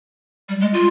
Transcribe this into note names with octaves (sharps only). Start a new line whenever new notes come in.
G3
G#3
F4